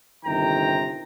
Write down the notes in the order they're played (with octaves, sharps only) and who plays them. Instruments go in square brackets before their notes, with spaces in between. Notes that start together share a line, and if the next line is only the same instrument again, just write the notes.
[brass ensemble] G1 C3 D#3 G5 A#5